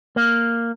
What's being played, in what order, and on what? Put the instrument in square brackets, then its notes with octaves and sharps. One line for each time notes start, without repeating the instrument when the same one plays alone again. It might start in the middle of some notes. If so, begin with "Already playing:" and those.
[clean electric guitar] A#3